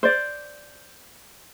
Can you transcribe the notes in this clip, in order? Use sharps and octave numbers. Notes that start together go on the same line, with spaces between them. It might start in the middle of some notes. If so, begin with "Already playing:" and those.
C5 D5